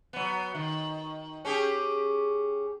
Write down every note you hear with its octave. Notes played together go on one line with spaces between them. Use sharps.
F#3 B3
D#3
C#4 G4 G#4